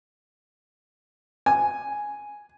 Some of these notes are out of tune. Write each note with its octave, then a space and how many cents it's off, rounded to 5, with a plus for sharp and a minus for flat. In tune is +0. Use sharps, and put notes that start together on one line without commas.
G#5 +0